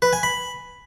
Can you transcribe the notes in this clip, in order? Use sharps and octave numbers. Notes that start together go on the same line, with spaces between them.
B4
G#5
B5